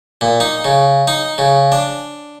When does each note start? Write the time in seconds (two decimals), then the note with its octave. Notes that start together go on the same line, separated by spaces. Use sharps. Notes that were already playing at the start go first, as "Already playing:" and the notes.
0.21 A#2
0.40 D#4
0.65 C#3
1.08 D#4
1.38 C#3
1.72 D4